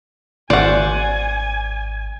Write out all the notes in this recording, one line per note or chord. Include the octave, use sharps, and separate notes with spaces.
G#1 C5 D5 F#5 G#5